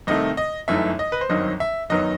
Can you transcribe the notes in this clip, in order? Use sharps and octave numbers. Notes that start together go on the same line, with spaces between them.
C2 C3 D#3 A3 D#5
D#5
G1 F#2 E3 A3 D#4 E5
D#5
B4
C5
G1 F#2 D#3 F#3 C4 D#5
E5
F#2 D#3 F#3 B3 D#4 D#5